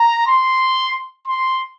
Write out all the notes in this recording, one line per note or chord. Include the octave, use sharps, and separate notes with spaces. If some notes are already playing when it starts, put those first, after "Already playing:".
Already playing: A#5
C6
C6